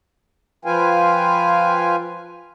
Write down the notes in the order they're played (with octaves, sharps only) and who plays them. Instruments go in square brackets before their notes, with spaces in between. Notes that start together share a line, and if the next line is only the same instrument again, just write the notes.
[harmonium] F3 F4 B4 F5 G5 G#5